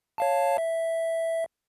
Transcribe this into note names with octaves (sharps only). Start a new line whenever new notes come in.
C#5 F5 A5
E5